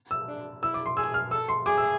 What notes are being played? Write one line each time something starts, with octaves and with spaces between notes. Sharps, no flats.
E6
D4
E4 E6
D6
C6
G#4 E6
F6
A4 E6
C6
G#4 D6
E6